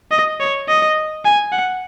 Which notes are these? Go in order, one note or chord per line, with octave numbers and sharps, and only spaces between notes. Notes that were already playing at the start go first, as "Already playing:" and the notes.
D#5
C#5
D#5
G#5
F#5